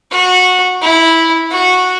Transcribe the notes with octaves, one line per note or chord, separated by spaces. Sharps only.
F#4
E4
F#4